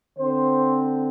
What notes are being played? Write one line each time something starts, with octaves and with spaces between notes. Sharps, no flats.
D3 C4 C5